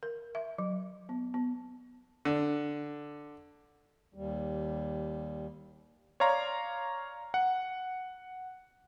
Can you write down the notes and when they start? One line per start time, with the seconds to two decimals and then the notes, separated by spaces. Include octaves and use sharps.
0.03 A#4
0.35 E5
0.58 F#3
1.09 B3
1.34 B3
2.25 D3
4.14 D#2 G3
6.20 C#5 D5 F5 A#5 C6
7.34 F#5